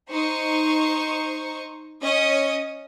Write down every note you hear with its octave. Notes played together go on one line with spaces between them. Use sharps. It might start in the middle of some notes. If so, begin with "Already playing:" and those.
D#4 C5 C#6
C#4 D#5 D#6